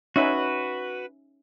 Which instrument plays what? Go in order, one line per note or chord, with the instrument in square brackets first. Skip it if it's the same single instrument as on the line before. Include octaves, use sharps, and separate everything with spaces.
[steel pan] C#4 D#4 E5 [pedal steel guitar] F#4 B4